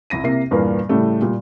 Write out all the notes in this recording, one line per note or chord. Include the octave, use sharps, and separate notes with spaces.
C2 E4 A#6 D#7
C3 A#3 E5 C7
E2 G2 A#2 A#3 B3 D5
A2 C#3 G3 A3
A#2 G3